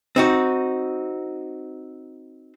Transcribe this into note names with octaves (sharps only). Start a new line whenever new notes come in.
C4 D#4 F#4